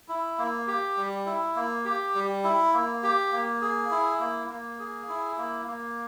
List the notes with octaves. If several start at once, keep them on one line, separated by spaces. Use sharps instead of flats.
E4
A#3
G4
G3
E4
A#3
G4
G3
E4
A#3
G4
A#3
G#4
E4
A#3
A#3
G#4
E4
A#3
A#3